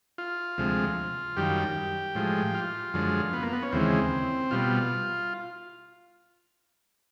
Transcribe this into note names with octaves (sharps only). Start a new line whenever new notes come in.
F4
D2 C3 F3 G#3
F#2 D#3 G3 G4
A2 F3 G#3
F4
F#2 D3 F3 G#3
B3
A#3
B3
C#4
D#2 C#3 E3 G#3 C4
B2 G3 F4